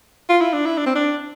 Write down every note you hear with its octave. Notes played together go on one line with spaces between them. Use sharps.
F4
E4
D4
E4
D4
C4
D4